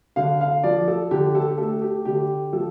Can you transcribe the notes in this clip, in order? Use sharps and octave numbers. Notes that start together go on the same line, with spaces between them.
D3 F5
F5
F3 D5
A4
D3 G4
A4
G4
A3 A4
G4
D3 G4
F3 A4